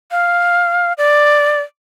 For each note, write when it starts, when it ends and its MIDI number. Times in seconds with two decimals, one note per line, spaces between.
0.11 0.93 77
0.98 1.61 74